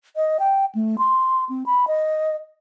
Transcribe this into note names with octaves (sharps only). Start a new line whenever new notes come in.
D#5
G5
A3
C6
C4
B5
D#5